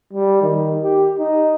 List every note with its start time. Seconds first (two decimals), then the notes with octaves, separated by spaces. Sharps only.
0.13 G3
0.42 D#3
0.83 G4
1.19 D#4